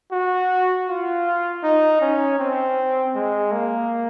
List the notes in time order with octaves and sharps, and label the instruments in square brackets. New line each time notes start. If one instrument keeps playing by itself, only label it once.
[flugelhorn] F#4
F4
D#4
C#4
C4
G#3
A#3